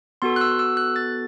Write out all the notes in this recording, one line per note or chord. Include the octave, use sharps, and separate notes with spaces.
B3 F#4 A4 C6
F#6
E6
E6
F#6
A6